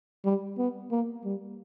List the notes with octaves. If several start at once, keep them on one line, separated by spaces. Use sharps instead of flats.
G3
B3
A#3
G3